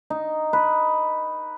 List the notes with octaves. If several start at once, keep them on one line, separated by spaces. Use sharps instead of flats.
D#4
B4